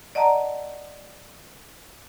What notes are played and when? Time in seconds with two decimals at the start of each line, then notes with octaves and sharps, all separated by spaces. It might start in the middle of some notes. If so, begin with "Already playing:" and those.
0.15 D5 D#5 F#5 A5 A#5